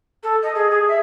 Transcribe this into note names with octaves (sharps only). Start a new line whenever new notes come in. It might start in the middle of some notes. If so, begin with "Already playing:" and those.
A4
D#5
G#4
G#4
E5